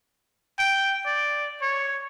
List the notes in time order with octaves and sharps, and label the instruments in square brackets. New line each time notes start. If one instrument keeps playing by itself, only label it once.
[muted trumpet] G5
D5
C#5